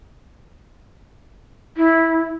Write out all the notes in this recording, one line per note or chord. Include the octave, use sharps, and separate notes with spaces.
E4